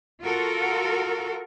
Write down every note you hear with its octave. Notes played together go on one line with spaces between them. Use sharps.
F4 F#4 A4 A#4